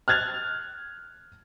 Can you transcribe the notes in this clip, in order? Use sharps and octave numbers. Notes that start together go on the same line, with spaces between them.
F6 F#6 G#6 A6 F7